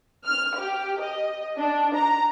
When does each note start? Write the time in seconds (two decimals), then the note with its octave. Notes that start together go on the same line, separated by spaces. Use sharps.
0.24 F6
0.57 G4
1.01 D#5
1.59 D4
1.95 A#5